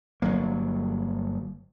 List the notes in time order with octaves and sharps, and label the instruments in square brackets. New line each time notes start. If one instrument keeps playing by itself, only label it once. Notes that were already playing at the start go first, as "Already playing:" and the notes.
[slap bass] G1 F#3 A#3